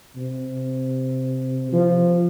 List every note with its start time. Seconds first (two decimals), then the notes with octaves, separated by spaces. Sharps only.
0.16 C3
1.73 F3